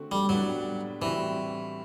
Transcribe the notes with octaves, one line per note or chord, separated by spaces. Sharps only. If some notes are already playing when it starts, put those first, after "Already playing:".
Already playing: D3 A3 C4 F#4
G3
A2 F#3 G3 B3 D4
A2 E3 G3 C4 F#4